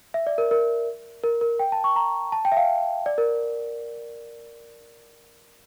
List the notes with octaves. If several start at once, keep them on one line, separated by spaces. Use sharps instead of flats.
E5
D5
A#4
A#4
A#4
A#4
G5
A5
C#6
A#5
A5
G5
E5
F5
D5
A#4